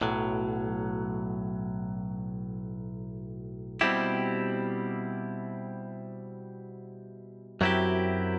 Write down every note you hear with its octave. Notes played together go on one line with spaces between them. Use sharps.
B1 A2 F#3
B2 G3 C4 E4 G4
F#2 F#3 C4 E4 G4